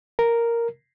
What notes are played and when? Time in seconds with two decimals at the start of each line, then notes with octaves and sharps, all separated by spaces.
0.19 A#4